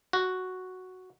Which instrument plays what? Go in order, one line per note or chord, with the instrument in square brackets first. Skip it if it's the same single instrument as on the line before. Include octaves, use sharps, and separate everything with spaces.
[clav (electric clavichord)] F#4